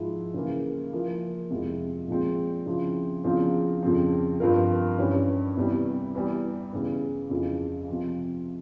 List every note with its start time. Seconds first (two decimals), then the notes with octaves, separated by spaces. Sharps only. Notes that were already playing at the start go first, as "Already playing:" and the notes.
Already playing: G#2 F3 G#3 E4
0.34 C#3 E3 A#3
0.93 F3 A#3 E4 A#4
1.50 F2 C3 F3 G#3 E4
2.08 A#2 F3 G#3 C4
2.66 C#3 F3 C4 E4
3.24 E2 C#3 F3 C4 F4
3.83 F2 C#3 F3 C4
4.40 G2 F3 C4 F4 A#4
4.98 G2 E3 G3 C#4
5.57 E2 C3 E3 G3
6.15 E2 E3 G3
6.73 E2 C#3 E3
7.30 F2 C#3 E3
7.88 C3 F3 C4